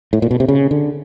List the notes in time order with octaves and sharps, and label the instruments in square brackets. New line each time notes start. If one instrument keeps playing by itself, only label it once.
[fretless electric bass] A2
A#2
B2
C3
C#3
D3